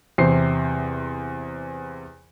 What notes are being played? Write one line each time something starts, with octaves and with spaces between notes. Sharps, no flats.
E2 C3 C5 C7